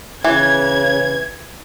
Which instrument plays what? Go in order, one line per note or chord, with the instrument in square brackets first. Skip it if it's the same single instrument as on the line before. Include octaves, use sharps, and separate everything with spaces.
[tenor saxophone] C#3 [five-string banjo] E3 [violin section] G#6